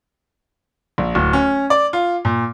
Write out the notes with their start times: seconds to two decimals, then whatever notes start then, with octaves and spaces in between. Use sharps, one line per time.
0.98 A#1
1.15 D1
1.33 C#4
1.70 D5
1.93 F4
2.25 A#2